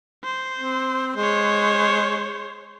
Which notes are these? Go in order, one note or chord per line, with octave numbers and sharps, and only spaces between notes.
C5
C4
G#3 C5 C#5